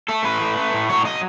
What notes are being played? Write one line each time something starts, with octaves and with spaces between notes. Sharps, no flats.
A3 A4
A2 B4
A3
A3
A2
F#3 C#5
F#3 D#5